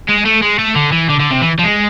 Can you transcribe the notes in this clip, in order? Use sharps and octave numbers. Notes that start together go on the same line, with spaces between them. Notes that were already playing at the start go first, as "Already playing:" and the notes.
G#3
A3
G#3
A3
D3
E3
D3
D3
C3
E3
F3
G#3